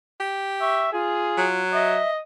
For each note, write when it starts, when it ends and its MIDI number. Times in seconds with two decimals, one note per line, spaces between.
0.20 0.98 67
0.61 0.89 76
0.61 0.91 85
0.93 1.62 65
0.93 1.48 68
1.38 1.99 54
1.73 2.21 75
1.73 2.10 76